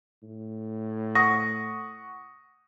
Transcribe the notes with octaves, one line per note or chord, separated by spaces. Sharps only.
A2
F#5 C#6 D#6 A#6